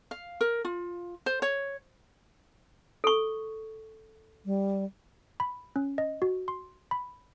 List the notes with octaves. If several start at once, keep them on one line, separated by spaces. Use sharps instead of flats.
F5
A#4
F4
C5
C#5
A4 C#6
G3
B5
C#4
D#5
F#4
C6
B5